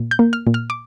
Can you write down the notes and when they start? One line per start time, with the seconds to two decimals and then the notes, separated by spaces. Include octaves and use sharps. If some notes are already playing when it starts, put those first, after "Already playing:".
Already playing: A#2
0.11 G6
0.19 A#3
0.33 F6
0.47 A#2
0.54 F6
0.70 D6